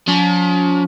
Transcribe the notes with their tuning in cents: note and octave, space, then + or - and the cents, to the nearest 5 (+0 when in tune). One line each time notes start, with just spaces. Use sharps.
F3 +40 C#4 +45